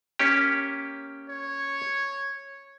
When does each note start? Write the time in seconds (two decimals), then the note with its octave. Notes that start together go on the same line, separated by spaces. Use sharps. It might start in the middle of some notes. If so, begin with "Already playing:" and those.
0.19 A#3 C#4 G4
1.29 C#5